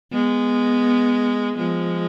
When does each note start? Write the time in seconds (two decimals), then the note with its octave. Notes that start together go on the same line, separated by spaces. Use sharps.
0.12 G#3 B3
1.58 F3 G#3